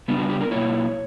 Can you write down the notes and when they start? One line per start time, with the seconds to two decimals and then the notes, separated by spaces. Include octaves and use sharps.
0.08 C#3 G3 B3 D4
0.19 F#4
0.30 G4
0.41 A#4
0.51 B2 F#3 A#3 E4 C#5